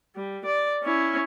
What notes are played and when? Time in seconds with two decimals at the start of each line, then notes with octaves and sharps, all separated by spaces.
0.15 G3
0.45 D5
0.84 C#4 E4